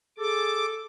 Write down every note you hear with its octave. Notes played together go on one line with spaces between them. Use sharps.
G#4 A4 D6